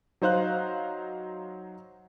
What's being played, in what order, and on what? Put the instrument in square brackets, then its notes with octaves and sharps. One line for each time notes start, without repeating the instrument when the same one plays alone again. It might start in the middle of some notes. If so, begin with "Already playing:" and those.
[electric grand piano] F#3 D#4 C5 F5 F#6